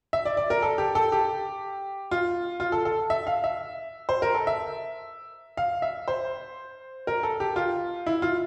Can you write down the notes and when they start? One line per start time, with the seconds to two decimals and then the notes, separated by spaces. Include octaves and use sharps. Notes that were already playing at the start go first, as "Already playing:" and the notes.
0.13 E5
0.25 D5
0.37 D5
0.50 A#4
0.62 A4
0.78 G4
0.95 A4
1.12 G4
2.11 F4
2.60 F4
2.72 A4
2.85 A4
3.10 E5
3.27 F5
3.44 E5
4.09 C5
4.22 A#4
4.34 A4
4.47 E5
5.57 F5
5.82 E5
6.08 C5
7.07 A#4
7.23 A4
7.40 G4
7.56 F4
8.06 E4
8.22 F4